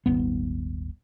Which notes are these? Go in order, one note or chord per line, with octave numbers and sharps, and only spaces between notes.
D#1 G#1 B3